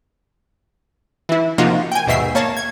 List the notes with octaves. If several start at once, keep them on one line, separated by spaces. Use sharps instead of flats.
E3 E4
C3 F3 A#3 D#4 F4 F#4
G5 G#5
D#2 G#2 B2 E5 C7
A#3 C#5 A5
G#6